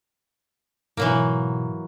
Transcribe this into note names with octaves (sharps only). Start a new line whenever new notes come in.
G#2 B2 E3 F#3 A#3